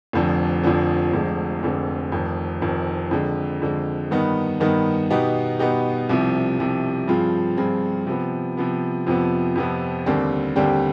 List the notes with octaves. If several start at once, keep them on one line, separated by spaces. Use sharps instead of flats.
F1 F2 D3 F3
F1 F2 D3 F3
F1 F2 D3 G#3
F1 F2 D3 G#3
F1 F2 D#3
F1 F2 D#3
F2 D3 G#3
F2 D3 G#3
G2 D#3 B3 D#4
G2 D#3 B3 D#4
B2 B3 D#4 G4
B2 B3 D#4 G4
C2 C3 F3
C2 C3 F3
G2 F3 C4 F4 G#4
G2 F3 C4 F4 G#4
C3 F3 B3
C3 F3 B3
F2 C3 F3 B3
F2 C3 F3 B3
D#2 D3 G3 C4 G4
D#2 D3 G3 C4 G4